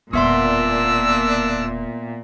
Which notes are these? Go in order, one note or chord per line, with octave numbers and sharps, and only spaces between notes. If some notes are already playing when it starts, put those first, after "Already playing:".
E1 A#2 B3 C4 D4 E5 C6 E6